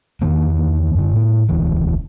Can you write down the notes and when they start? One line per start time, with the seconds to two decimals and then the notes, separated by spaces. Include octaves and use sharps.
0.22 E2 D#3 A#3
0.95 F#2 D3
1.12 A2 A#3
1.49 E1 D2 E3